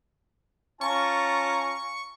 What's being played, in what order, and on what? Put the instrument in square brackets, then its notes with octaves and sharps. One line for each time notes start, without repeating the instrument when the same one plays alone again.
[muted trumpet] C#4 [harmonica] F4 A5 A#5 [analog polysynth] C#6